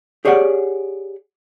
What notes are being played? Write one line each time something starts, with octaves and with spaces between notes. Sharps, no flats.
G4 G#4 C#5 D5 F#5